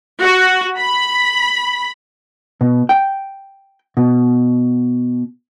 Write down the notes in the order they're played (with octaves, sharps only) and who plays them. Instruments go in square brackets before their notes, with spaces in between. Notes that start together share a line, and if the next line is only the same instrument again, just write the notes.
[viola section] F#4
B5
[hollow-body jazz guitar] B2
G5
B2